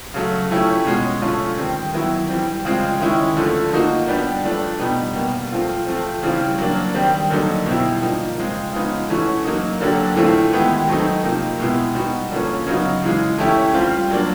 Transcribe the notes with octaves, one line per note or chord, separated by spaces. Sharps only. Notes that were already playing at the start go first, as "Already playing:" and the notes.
C#3 F#3 A3
F3 A3 C#4 E4 G4
B2 G#3 C#4 F#4
D3 F3 A3 C#4 F4
D#3 G3 C4
D#3 F#3 B3 E4
E3 G3 C4
C#3 F3 G#3 C4
D#3 G#3 C#4 E4
D3 F3 A3
F3 A#3 D#4 F#4
G3 B3 D4 G4
F3 A3 D4
B2 G3 B3 D#4
B2 G3 A#3
F3 A3 C4 F4
F3 A3 C4
C#3 E3 G3 C4
F#3 A#3 D4
D#3 G3 C4
D3 F#3 A#3 D#4
B2 G3 C4 E4
F3 A#3 D#4
C#3 F3 G#3 C4
C#3 F3 G#3 B3 D#4
E3 A3 C#4 F#4
F#3 A#3 D#4
D3 F#3 A#3 D4 G4
A2 E3 A3 C4 F4
D#3 G#3 B3 E4 G4
F#3 A3 C4 D#4
C3 F3 A#3 D#4
B2 G#3 B3 E4 G4
G3 B3 D#4 F#4
D3 F3 A#3 C#4
C#3 F#3 B3 D#4 F#4
C#3 E3 G#3
E3 A3 C#4 E4 G4
G3 C4 F4
F#3 A#3 D4